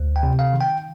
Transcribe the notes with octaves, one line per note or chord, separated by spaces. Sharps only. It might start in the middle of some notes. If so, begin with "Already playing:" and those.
Already playing: D2
G5
C3
F5
D#3
G5